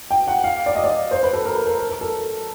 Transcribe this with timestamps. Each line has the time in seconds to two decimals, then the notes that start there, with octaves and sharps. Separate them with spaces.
0.11 G5
0.28 F#5
0.44 F5
0.66 D5
0.75 D#5
0.84 D5
1.11 C5
1.23 B4
1.33 A4
1.45 A#4
1.56 A#4
1.67 A#4
1.78 A#4
1.89 A#4
2.01 A4